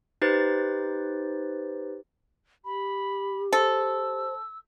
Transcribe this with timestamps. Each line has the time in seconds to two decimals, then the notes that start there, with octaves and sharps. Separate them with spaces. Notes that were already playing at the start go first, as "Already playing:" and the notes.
0.22 D#4 G4 B4 C5 A6
2.65 G4 B5
3.53 A4 C5 E6